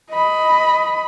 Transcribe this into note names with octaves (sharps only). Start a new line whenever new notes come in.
D#5 B5